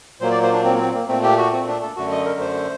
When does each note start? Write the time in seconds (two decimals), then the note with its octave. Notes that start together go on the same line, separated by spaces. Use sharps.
0.20 A#2 F#3 A#3 C5
0.31 D5
0.42 C5
0.53 D4
0.64 C4
0.74 A#3
0.79 C4
0.94 A#3
1.08 A#2 A3 C4
1.23 G4
1.38 F#4
1.52 C4
1.68 D4
1.82 A4
1.96 F#2 D3 A3 F#4
2.11 D#5
2.25 A#4
2.40 C5